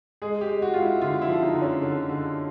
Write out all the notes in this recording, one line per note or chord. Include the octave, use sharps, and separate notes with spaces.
G#3 G#4
G4
G#3
F#4
G#3 F4
E4
D3 F4
E4
F3
D#4
D3
C#4
D3
D3